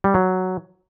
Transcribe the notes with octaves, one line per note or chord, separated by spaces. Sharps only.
G3
F#3